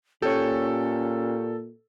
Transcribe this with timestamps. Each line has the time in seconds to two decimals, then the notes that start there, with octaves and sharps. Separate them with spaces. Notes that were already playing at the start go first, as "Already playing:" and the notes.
0.22 A#2 C#4 G4 A4 C#5